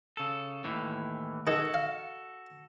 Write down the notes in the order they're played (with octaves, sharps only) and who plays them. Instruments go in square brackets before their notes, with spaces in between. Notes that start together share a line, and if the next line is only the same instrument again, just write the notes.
[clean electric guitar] C#3 A4
D#2 A2 E3
[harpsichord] D#3 G#4 [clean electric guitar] F#4 A4
[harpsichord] F5